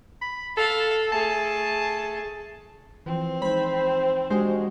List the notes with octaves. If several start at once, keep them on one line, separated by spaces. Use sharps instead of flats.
B5
A4 F5
A3 G#4 A5
E3 F3 C4
G#3 D#4 C5 B5
G#3 D4 F#4 G4 C5